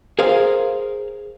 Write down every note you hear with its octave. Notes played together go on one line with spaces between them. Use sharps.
G#4 A#4 C5 F5